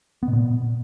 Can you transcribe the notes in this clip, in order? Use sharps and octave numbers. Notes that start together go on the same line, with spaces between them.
B3
B2
A#2